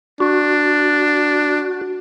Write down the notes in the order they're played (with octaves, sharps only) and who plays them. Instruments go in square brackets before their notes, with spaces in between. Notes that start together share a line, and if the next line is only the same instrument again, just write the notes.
[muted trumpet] D4 [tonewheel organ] F#4